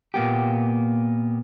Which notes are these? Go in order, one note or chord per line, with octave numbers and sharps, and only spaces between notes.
A#2 A#3 B3 G4